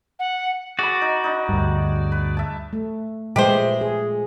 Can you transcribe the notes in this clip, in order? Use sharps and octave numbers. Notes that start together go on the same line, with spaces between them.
F#5
F#4 G#4 D5 B5
D#4
D4 D#4
D2 G2
B4
E5 A5
A3
A#2 F3 G#3 A3 G4 B4 C5
G#4